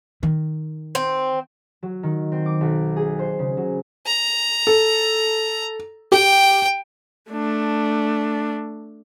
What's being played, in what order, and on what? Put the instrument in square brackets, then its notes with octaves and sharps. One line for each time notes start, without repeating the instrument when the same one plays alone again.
[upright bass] D#3
[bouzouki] C4
[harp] F#3
D#3
C4
D6
B1
G#4
C5
C#3
F#3
[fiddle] A#5
[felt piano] A4
[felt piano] G4 [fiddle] G5
[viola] A3 D4